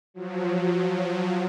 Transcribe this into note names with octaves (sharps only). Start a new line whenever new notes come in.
F3 F#3